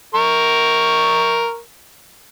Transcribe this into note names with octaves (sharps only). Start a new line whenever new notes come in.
A#4 C#6